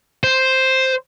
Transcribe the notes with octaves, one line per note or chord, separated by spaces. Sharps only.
C5